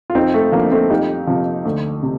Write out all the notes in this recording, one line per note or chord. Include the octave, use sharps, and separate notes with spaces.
F4
F2 C4 D#4
A3
D3 F3 A#3
A3 C4
F2 D#4 G4
C3 F3
D2
C3